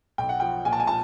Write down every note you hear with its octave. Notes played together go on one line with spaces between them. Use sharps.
B1 G5
F#5
F3 G5
A#2 G#5
A5
G#5
A#2 A5